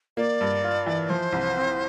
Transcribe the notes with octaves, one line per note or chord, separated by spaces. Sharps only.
A#3 D5
G2
F4
E3
F3 C5
C2
C4